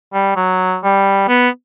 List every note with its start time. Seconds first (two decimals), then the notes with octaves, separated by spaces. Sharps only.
0.14 G3
0.36 F#3
0.83 G3
1.29 B3